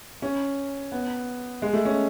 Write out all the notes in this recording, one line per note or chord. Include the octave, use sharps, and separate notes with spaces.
C#4
B3
G#3
A3
C#4